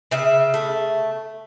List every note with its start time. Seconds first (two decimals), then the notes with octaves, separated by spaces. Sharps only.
0.11 C#3 E5
0.54 A3